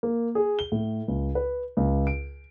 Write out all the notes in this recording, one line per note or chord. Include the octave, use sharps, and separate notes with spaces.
A#3
G#4
G7
A2
C#2
B4
C#2
D7